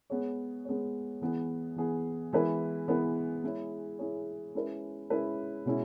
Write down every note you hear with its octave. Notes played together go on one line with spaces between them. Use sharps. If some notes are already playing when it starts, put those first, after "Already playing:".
G#3 B3 G#4 C#5
G#3 B3 G#4 C#5
E3 B3 G#4
E3 B3 G#4
E3 G#3 B3 E4 B4
E3 G#3 B3 E4 B4
G#3 E4 G#4 C#5
G#3 E4 G#4 C#5
G#3 C#4 E4 B4
G#3 C#4 E4 B4
B2 G#3 C#4 E4